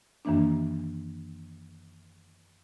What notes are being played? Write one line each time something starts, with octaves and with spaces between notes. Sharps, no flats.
F#2 D#3 E3 A#3 D4